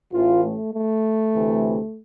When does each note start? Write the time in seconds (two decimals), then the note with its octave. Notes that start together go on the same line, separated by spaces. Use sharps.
0.12 A1 A2 E3 F4
0.43 A3
0.74 A3
1.34 D2 C3 E3